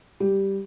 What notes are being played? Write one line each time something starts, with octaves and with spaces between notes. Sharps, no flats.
G3 G4